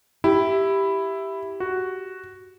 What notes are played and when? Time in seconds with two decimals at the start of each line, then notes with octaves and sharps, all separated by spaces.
0.24 E4 G4
1.60 F#4